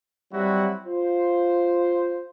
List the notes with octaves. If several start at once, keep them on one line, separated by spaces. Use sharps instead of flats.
F#3 G3 C4 E4 F#4
F4 C5